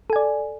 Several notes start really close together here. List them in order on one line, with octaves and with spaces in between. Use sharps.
A4 G#5 D5